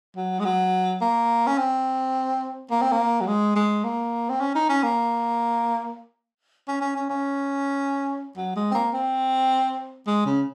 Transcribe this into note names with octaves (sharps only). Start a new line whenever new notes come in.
F#3
G#3
F#3
A#3
C#4
C4
A#3
C4
A#3
F#3
G#3
G#3
A#3
C4
C#4
D#4
C#4
A#3
C#4
C#4
C#4
C#4
F#3
G#3
C4
A#3
C4
G#3
C#3